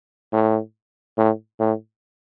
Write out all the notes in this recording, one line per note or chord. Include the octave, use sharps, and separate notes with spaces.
A2
A2
A2